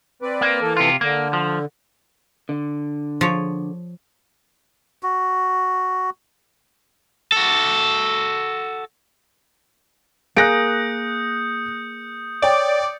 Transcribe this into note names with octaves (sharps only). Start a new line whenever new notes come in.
C4 B4 D5
A#3
E3 A4
C3 F4
D3 A#3
F3
D3
F3 C#5
F#4
F#4 A4
A#3 G#4 D#6 F#6 G6 A#6 C#7 D7
C#5 D5 G5